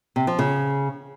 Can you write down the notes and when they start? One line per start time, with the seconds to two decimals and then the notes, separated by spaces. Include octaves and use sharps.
0.16 C3
0.27 F3
0.39 C#3